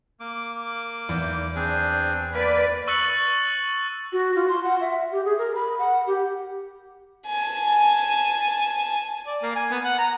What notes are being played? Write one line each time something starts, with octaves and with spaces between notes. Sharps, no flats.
A#3 D6
E2
C4 D4 G#4
A#3 B4 D5
C#6 E6 F#6 A6 C#7 F#7
F#4
F4
C6
F#5
E5
G4
G#4
A#4
B5
F#5
G4
G#5 A5
D5
A#3
G#5
B3
F#5
A#5